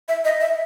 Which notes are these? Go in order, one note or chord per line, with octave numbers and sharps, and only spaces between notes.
E5
D#5
E5